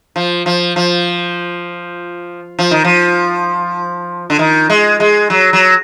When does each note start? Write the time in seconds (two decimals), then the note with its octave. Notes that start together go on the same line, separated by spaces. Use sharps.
0.16 F3
0.46 F3
0.76 F3
2.59 F3
2.71 D#3
2.84 F3
4.30 D3
4.39 D#3
4.70 G#3
5.00 G#3
5.30 F#3
5.53 F#3